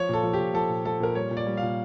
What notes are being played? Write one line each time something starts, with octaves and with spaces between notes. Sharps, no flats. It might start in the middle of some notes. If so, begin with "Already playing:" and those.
Already playing: F3 C#5
A#2 A4
F3
G4
A#2
F3 A4
A#2
F3 A4
A#2 A#4
G3 C#5
A#2
D5
G3
F5
A#2